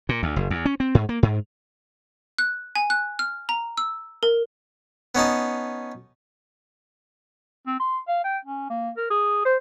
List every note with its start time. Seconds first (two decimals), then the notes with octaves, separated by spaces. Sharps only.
0.09 A#2
0.23 D2
0.36 F#1
0.50 E2
0.66 C#4
0.80 C4
0.95 G#2
1.09 A#3
1.23 G#2
2.38 F#6
2.75 G#5
2.90 F#6
3.19 F6
3.49 A#5
3.77 E6
4.23 A#4
5.15 B3 C#4 D#4 A5
7.67 C4
7.80 C6
8.08 F5
8.24 G5
8.45 C#4
8.70 A#3
8.97 A#4
9.10 G#4
9.45 C5